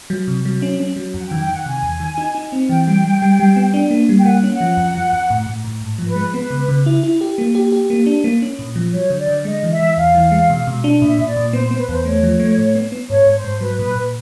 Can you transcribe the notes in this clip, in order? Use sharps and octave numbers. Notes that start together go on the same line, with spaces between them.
F#3
C3
F#3
C#4
C#4
F#3
F2 F#5
G5
D#3
G5
D#3 F#5
C3 G#5
E2
D#3
D#4
D#4
C4
E3 G5
G3
G3
G3
G3
B3
D4
A#3
G3
G5
A#3 F#5
C#4
F#5
F3
F2
F3
F2
A2
A2
A2
G#2
F3
B4
G#3
B3 B4
C#3
C#3
E4
E4
G4
A#3
G4
G4
A#3
D4
A#3
C#4
A#2
F3
F#3 C#5
D3
D5
D3
G#3 D#5
E3
E5
E3
E2 F5
E3
G#3
B2
B2
D4
A#2 E5
A#2
D5
A#2
B3 C5
C5
B3
B4
E2 C5
A3 C#5
F3
A3
A2
B3
B3
G#2 C#5
G#2
C5
G#2
F#3 B4
A#2
A#2